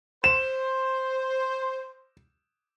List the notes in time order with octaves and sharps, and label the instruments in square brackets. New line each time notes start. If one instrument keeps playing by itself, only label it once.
[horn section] C5 [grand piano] E7